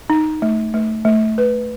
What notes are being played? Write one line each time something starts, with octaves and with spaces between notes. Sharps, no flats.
D#4
A3
A3
A3
B4